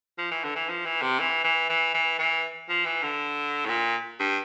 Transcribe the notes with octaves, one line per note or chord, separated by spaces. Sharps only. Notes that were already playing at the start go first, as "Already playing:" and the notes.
F3
E3
D3
E3
F3
E3
C3
E3
E3
E3
E3
E3
F3
E3
D3
A2
A#2
G2